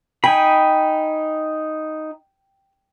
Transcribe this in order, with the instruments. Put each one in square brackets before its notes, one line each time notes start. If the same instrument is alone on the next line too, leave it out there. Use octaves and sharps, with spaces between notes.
[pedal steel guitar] D#4 G#5 B5 [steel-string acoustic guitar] G5